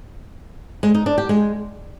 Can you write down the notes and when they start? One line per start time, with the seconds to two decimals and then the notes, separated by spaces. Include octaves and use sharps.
0.83 G#3
0.95 D#4
1.06 D4
1.18 G4
1.29 G#3